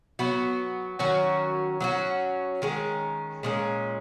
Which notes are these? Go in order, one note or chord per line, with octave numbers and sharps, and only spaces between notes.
F#3 B3 F#4
D#3 F#3 C#4 F#4
F#3 C#4 F#4
D#3 G#3 C#4
A#2 G#3 C#4